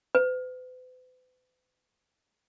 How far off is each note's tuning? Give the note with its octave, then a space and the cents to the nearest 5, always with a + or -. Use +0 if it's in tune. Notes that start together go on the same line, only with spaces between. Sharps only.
B4 +45